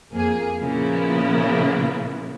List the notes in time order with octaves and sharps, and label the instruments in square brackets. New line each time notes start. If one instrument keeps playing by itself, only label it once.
[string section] F2 A#3 G#4
A#2 C#3 F3 A#3 B3 E4